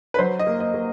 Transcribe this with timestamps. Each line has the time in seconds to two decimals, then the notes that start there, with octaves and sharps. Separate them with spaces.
0.14 B4
0.19 F#3 C5
0.39 D#5
0.46 A#3
0.60 D#5
0.74 A#3